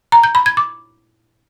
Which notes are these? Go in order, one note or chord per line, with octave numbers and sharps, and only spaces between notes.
A#5
G6
B5
G#6
D6